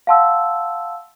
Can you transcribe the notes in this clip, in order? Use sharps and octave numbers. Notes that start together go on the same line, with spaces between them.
F5 F#5 A5 C6 E6